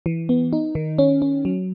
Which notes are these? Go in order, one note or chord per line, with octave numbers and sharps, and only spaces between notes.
E3
B3
D#4
D#3
C#4
C#4
F#3